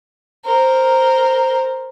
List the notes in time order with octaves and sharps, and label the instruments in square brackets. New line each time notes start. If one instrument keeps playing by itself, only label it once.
[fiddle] A#4 C5